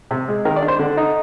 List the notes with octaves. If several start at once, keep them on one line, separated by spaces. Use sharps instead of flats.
C3
G#3
D#3 A#4
D5
D4
C5
D3
D#4